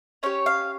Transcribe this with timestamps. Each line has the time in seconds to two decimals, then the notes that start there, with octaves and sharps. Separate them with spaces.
0.23 C#4 G4 C#5
0.46 F5